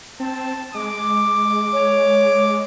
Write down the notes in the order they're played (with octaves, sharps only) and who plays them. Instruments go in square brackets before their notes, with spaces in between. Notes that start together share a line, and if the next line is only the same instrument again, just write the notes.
[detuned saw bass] C4 [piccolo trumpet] A5
[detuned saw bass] G#3 [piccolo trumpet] D6
[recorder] C#5